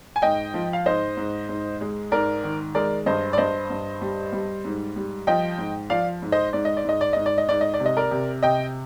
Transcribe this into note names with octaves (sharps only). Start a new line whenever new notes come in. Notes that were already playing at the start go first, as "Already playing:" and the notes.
G#5
G#2 D#5 G5
F3
F5
G#2 C5 D#5
G#2
G#2
G#3
G#2 A#4 D5
D#3
G#3 A#4 D5
G2 C5 D#5
D5
G2 C5 D#5
G2
G3
G3
G#2
G3
F3 D#5 G5
G#2
F3 D5 F5
G#2
C5 D#5
G#2 D5
D#5
D5
G#2 D#5
D5
G#2 D#5
D5
D#5
G#2 D5
D#5
D5
C3
D#5
A#4 D5
C3
C3 D#5 G5